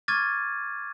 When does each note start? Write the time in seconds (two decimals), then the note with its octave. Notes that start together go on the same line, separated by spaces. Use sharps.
0.08 C#6 D6 F6 G#6 A6 D#7